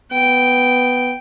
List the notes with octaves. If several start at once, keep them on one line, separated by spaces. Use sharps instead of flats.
B3 G5